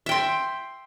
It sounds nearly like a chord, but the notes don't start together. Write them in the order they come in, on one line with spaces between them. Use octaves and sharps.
E5 G5 C6